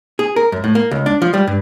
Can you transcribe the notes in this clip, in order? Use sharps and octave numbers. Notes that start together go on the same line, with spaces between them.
G#4
A#4
F#2
A2
A#3
C#2
D4
F3
G3
G2